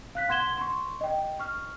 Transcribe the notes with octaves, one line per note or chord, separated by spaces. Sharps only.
F5 F#6 B6
F#5 C6 G#6 E7 G7
C6 C#6
D#5 G5
C#6 F6